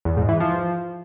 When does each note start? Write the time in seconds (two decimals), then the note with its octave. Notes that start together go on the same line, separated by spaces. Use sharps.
0.05 E2
0.17 G#2
0.29 E3
0.40 F3